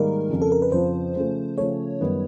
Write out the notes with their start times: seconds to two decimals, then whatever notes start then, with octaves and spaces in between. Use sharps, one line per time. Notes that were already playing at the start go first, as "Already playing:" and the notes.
Already playing: G#2 D#3 G3 A#3 A#4
0.29 F2 C#3 F3
0.42 A4
0.52 A#4
0.62 B4
0.72 F2 C#3 F3 C5
1.15 C#3 F3 A3
1.57 C#3 F3 A3 C#5
2.00 F#2 D#3 G3 B3